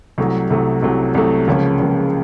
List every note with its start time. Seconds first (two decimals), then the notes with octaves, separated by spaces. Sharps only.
0.18 C2 C3 F#3 A3
0.50 C2 C3 F#3 A3
0.82 C2 C3 F#3 A3
1.15 C2 C3 F#3 A3
1.47 C#2 C#3 F3 A#3 C#4
1.80 C#2 C#3 F3 A#3 C#4